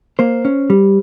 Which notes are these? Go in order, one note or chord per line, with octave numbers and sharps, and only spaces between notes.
A#3 C5
C#4
G3